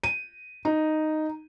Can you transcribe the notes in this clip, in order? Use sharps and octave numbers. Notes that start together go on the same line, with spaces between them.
D#7
D#4